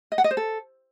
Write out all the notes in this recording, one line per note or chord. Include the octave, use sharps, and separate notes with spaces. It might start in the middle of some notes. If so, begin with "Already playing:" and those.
D#5
F#5
D#5
C5
A4